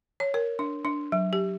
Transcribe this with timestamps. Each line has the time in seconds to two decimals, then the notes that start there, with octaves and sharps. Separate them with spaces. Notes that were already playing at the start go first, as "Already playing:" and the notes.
0.20 C#5
0.34 A#4
0.59 D4
0.85 D4
1.12 F#3
1.33 G4